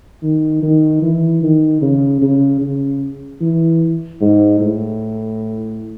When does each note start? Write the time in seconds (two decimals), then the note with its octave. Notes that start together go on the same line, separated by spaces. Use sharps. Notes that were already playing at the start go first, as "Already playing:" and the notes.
0.23 D#3
0.63 D#3
1.02 E3
1.43 D#3
1.82 C#3
2.22 C#3
2.62 C#3
3.41 E3
4.22 G#2
4.61 A2